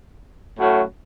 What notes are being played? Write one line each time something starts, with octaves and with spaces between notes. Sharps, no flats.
A2 F#3 A3 C#4 F#4